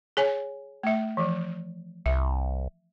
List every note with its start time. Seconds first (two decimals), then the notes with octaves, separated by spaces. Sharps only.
0.17 G#4 C#5 G#5
0.83 A3 E5
1.17 E3 F3
2.06 C2 E5